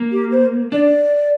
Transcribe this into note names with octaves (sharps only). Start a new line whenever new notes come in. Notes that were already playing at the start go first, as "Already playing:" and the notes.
Already playing: A#3
G4
C5
D4 D5